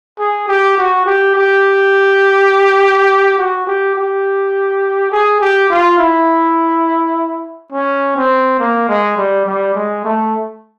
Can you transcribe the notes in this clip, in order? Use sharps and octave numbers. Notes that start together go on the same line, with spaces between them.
G#4
G4
F#4
G4
G4
F#4
G4
G4
G#4
G4
F4
E4
C#4
C4
A#3
G#3
G3
G3
G#3
A3